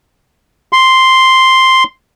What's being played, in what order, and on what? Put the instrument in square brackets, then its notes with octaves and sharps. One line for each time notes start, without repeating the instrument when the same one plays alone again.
[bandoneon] C6